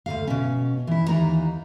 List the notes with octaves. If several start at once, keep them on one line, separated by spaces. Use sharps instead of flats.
D2 A#2 F5
B2 C#4
E3 E4
D#2 E3 D#4 A#5